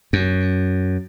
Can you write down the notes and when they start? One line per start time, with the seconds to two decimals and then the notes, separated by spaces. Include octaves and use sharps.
0.13 F#2